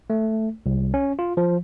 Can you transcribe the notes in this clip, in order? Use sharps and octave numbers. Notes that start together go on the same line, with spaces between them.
A3
C2
C#4
F4
F3